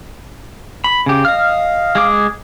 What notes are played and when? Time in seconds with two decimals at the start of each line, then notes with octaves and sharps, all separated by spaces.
0.84 B5
1.06 C#3 G4
1.25 D#5 F5 F6
1.95 G#3 G#4 D6